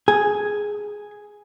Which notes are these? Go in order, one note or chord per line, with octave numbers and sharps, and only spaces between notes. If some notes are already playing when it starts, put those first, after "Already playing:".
G#4